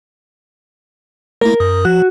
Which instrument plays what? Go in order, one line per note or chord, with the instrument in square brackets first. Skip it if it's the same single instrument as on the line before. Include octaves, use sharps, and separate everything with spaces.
[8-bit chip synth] A3 A#3 E4 [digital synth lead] A#4
[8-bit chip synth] F#2 D#6
[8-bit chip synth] F3 [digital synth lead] F#4